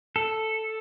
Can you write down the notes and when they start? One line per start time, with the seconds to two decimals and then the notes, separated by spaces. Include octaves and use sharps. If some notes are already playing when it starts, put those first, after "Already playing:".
0.16 A4